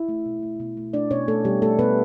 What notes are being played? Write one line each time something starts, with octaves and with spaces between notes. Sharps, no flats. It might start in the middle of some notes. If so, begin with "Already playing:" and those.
Already playing: E4 E5
A3
B2
A3
B2
A3
A3 D4 D5
B2 C#4 C#5
A3 A4
B2 G3 G4
A3 A4
B2 B3 B4